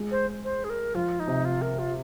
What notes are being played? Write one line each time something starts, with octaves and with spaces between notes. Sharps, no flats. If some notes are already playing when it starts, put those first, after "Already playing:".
Already playing: G#3
C5
C5
G#4
A#4
F3 F4
D#4
C3
F4
A#4
F4